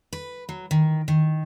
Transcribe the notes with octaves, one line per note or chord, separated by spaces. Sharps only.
B4
F#3
D#3
D#3